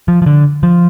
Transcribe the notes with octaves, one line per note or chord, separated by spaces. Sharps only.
F3
F3
D3
F3